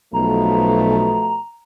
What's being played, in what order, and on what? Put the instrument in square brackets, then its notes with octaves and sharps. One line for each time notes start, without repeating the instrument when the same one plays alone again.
[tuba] B1 [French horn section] B2 F3 A3 [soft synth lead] A#5